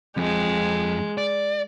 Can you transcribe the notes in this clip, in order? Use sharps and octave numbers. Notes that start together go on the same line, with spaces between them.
F2 G#3
D5